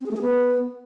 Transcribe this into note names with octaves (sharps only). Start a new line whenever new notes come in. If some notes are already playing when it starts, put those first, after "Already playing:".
C4
G#4
A3
G#4
B3